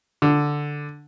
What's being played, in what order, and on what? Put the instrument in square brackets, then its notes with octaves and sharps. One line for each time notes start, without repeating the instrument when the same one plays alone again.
[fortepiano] D3